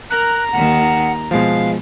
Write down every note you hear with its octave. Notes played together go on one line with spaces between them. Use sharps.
A#4 A#5 F#6
D#2 D#3 F#5
B2 F3 G#3 F5